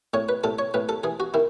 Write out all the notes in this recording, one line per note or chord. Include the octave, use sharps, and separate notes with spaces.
A2 C#5
B4
A2 A4
C#5
A2 B4
A4
E3 G#4
F#4
D#3 E4